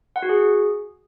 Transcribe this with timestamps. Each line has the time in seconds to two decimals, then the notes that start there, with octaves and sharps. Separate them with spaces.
0.16 F#5
0.22 F#4
0.29 G#4